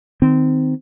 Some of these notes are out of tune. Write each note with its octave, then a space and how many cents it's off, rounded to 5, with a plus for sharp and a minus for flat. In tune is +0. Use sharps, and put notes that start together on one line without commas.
D#3 +0 C4 -20